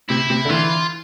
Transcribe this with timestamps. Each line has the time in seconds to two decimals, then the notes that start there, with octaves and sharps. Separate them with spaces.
0.09 C3 E4
0.30 C3
0.45 D3
0.49 E3 F4